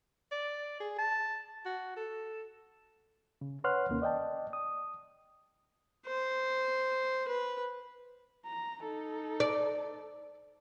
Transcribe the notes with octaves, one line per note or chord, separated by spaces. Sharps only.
D5
G#4
A5
F#4
A4
C#3
B4 C#5 F#5 C6 F6 F#6
D#2 C3 D#3 A#3 C#4
D5 D#5 G5 A5
D#6
C5
B4
A#5
D#4 A4
D5